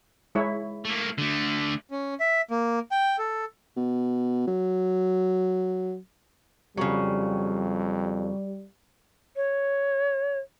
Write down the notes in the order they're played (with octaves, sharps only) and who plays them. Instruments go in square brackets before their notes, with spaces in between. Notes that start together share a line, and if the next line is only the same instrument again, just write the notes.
[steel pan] G#3 E4 C#5
[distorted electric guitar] A3 A#3
D3 A3
[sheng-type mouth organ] C#4
E5
A#3
G5
A4
[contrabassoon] B2
F#3
[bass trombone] F2 [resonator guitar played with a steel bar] C#3 F#3 [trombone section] G3
[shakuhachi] C#5